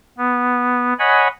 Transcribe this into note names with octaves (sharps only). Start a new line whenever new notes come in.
B3
C#5 D#5 F#5 G#5 B5